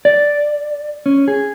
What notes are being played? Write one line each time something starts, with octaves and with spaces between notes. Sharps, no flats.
D5
C#4
G#4